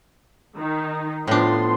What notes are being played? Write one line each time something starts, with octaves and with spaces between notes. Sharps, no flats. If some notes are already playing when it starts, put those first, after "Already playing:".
D#3 D#4
A2 F3 B3 D4 C6